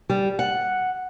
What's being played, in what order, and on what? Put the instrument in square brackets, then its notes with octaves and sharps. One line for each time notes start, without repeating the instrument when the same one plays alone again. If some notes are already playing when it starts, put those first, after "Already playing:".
[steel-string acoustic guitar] G3
F#5